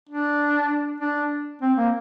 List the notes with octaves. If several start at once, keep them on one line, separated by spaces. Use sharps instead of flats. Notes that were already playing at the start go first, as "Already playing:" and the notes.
D4
D4
C4
A#3